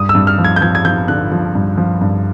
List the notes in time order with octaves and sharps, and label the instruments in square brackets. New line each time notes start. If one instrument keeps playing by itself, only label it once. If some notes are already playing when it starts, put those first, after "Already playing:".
Already playing: [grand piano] G2 D#6
E6
G2
F6
F3
G#6
G6
F3 G#6
G#6
F3 G6
D3 F#6
F3
G2
F3
G2